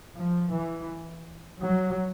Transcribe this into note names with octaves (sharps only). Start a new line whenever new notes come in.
F3
E3
F#3